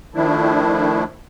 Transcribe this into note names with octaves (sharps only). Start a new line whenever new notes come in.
D#3 F3 A3 D4 E4